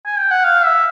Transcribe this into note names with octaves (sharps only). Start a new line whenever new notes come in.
G#5
G5
F#5
F5
E5